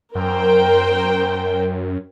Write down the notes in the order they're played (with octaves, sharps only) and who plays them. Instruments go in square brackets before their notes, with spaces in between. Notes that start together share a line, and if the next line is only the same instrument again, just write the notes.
[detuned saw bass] F#2 [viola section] A#4 C5 G5